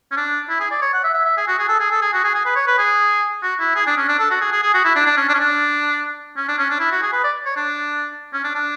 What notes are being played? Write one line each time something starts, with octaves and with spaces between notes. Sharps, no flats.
C#4
D4
E4
G#4
D5
C#5
F#5
E5
E5
E5
G#4
F#4
G#4
A4
G#4
A4
G#4
F#4
G#4
G#4
B4
C#5
B4
G#4
F#4
E4
G#4
D4
C#4
D4
A4
F#4
G#4
G#4
G#4
F#4
E4
D4
D4
C#4
D4
C#4
D4
C#4
D4
C#4
D4
E4
F#4
G#4
B4
D5
C#5
D4
C#4
D4
D4